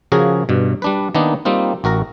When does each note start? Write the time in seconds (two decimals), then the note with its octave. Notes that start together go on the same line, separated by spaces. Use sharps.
0.12 C#3 F3 F#4 G#4 A#4
0.49 G2 B2
0.82 G3 D4 B4
1.15 D#3 A#3 B3 D4 D#4
1.45 G3 A#3 C4 D#4 F4
1.84 A1 F#4 A#4 A#5